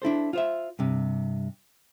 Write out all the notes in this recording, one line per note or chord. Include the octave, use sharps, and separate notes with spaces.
D4 E4 A4 C5
F4 C5 E5
G2 C3